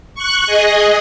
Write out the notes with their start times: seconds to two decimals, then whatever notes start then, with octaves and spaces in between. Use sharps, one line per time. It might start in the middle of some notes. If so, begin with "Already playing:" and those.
0.15 C#6 F#6
0.46 G#4 D#5